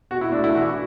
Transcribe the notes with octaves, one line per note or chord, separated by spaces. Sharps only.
B2 F#4
E4
A3 D4
E4
E3 F#4